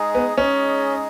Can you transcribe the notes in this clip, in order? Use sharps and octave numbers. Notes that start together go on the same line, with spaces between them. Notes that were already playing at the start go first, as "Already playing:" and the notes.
Already playing: G#3 D#4 G#4 D#5
B3
G#3 C#4 D#4 G#4 D#5